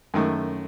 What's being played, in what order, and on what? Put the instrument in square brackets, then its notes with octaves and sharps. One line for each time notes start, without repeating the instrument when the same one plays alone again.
[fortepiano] F#2 D#3 A3